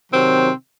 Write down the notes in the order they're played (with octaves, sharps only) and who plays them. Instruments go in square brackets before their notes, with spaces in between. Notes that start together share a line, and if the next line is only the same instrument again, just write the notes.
[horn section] C3 D#3 F#3 C4